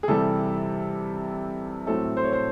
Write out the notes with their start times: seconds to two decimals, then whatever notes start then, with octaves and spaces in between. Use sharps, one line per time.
0.03 G#4
0.08 C3 E3 G3 A4
1.87 A2 F#3 A3 C4 A4
2.17 C5
2.24 C#5
2.33 C5